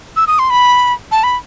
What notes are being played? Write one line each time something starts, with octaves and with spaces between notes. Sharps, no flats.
E6
D#6
C6
B5
A5
B5